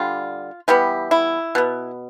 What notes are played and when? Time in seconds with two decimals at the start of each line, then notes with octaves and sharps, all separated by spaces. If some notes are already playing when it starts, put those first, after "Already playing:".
Already playing: D3 G3 F4
0.68 E3 G3 B3 G4
1.11 E4
1.55 B2 B3